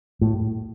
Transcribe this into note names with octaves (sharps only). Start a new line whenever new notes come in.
A2